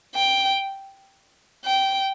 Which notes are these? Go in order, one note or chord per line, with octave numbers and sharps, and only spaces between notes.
G5
G5